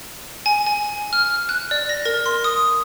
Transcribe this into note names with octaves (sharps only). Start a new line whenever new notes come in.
G#5
G#5
F6
F#6
D5
A#6
A#4
C6
D#6